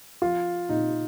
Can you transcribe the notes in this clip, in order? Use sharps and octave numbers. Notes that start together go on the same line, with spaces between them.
F3 F4
A#2 D#4